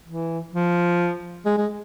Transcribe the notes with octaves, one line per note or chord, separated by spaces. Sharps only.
E3
F3
G#3
G#3